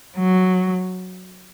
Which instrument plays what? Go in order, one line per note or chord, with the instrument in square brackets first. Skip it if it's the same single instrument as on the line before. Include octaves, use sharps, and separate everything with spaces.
[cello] F#3